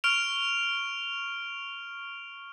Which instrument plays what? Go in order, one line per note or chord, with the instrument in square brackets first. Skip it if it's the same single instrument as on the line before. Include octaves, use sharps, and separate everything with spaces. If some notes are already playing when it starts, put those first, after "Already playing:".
[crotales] C#6 F6 D7 F7